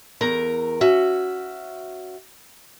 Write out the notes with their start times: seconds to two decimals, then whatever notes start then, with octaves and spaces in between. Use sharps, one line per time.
0.21 E2 A#4 A#5
0.81 C#4 F#4 E5